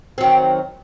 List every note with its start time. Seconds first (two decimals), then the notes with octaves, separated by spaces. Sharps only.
0.18 C4
0.21 F#3
0.23 D#3